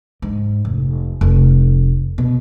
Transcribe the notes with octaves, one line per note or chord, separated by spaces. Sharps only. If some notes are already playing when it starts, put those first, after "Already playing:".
G#2
F1
F1
B2